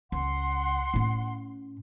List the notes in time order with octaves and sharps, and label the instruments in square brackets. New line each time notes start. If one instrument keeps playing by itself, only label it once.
[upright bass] C#2 [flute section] F#5 C6
[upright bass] A2 C#4